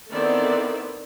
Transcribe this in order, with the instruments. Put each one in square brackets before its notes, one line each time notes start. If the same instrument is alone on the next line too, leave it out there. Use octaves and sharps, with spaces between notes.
[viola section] D#3 B3 C4 E4 A4 D5